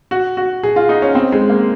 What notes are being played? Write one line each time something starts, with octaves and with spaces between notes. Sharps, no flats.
F#4
F#4
G#4
F4
D#4
C#4
C4
G#3
A#3